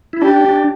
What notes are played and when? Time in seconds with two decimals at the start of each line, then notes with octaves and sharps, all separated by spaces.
0.13 E4
0.22 D4 G4
0.45 D4